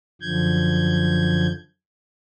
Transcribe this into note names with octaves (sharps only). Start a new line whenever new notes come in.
F#2 D3 F3 G6 G#6